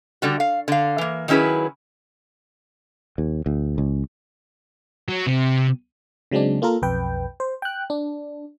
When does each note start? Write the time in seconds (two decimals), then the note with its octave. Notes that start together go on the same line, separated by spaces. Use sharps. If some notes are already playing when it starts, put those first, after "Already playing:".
0.22 D3 G3 F#4
0.40 F5
0.68 D3 F5
0.98 E3 A#3
1.28 D#3 F#3 C#4 E4 G#4 B4
3.18 D#2
3.46 D2
3.78 C#2
5.09 F#3
5.27 C3
6.31 C#3 F#3 G#3 C4 D4
6.62 A#3 F4 A4 A#4
6.82 B1 F2 B4 G5
7.40 C5
7.62 G5 F#6
7.90 D4